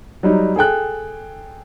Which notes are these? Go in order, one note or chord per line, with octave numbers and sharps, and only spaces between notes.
F#3 G3 D#4
G#4 A4 G5 F#6